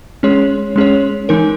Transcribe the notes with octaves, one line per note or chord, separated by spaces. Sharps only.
G#3 C#4 G#4 C#5
G#3 C#4 G#4 C#5
E3 G#3 D#4 A#4